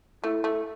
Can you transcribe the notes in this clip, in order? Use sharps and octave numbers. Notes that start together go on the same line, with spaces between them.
A3 E4
A3